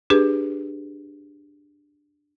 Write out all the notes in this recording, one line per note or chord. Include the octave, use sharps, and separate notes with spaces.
D4 G4 G#4 B4